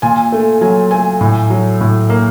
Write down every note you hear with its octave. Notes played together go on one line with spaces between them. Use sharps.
A#2 G#5
A3
F#3 G#5
A3 G#5
A2
F#3
A2
A#3